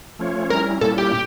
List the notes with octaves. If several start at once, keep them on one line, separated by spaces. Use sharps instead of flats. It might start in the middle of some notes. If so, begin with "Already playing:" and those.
F3 A3 C#4 F4 C#5
G3 C#4 E4 A#4
A#2 G3 A#3 C#4 E4 A4
G4